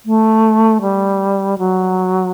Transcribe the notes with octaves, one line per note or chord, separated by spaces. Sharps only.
A3
G3
F#3